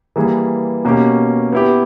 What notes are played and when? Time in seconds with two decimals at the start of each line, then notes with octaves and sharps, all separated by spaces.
0.16 E3 G3 A#3 E4 G#4
0.85 B2 A#3 C#4 G4
1.52 B3 E4 G4